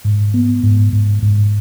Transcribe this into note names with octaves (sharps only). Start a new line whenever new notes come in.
G#2
B3
G#2
G#2
G#2